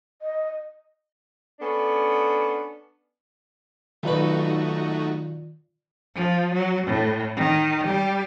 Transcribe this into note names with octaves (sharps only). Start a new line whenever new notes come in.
D#5
B3 C#4 D4 A4
B1 D#3 A3 D#4 F4 F#4 B4 D5
F3
F#3
A2
D#3
G3 G4